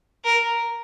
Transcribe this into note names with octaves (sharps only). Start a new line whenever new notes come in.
A#4